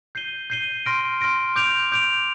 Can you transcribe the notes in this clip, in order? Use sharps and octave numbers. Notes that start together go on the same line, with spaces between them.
G6 C7 D#7 G7
G6 C7 D#7 G7
C6 F6 A#6 D7
C6 F6 A#6 D7
D6 G6 D7 F7
D6 G6 D7 F7